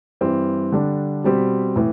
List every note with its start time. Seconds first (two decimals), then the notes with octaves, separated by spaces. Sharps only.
0.21 G2 E3 G3 C4
0.72 D3 G3 D4
1.24 B2 G3 C4 G4
1.76 A2 E3